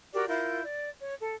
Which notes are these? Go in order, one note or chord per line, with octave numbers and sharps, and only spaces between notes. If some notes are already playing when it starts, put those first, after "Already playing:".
F#4 G4 A#4 D5
E4 F4 A#4 G6
D5
C#5
A4